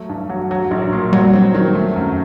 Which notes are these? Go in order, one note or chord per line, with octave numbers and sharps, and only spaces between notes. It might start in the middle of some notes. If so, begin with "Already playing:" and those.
Already playing: F#3 A3
G2
F#3
F#3
A#1
A#2
F#3 G3
C4
D#3
A3
F#2